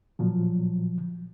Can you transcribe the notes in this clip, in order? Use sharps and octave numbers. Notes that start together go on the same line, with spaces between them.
A#2 F3 F#3